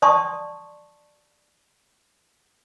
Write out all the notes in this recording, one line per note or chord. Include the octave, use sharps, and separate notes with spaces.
D5 G5 A5 C6 C#6 D#6